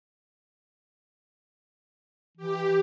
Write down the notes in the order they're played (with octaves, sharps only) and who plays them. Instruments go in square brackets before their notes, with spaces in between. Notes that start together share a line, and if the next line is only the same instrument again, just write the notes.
[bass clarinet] E3 [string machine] G4